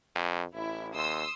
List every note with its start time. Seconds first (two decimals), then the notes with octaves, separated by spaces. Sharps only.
0.15 F2
0.55 A1 E4
0.94 D#2 C6 D#6 E6